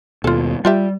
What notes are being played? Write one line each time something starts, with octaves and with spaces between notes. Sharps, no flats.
D#2 B2 F4 A4
G3 F4 G4 E5